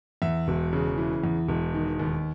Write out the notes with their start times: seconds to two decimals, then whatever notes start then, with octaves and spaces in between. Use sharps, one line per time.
0.22 E2 E5
0.48 E1
0.73 C#3
0.98 E3
1.24 E2
1.49 E1
1.74 D#3
1.99 D#2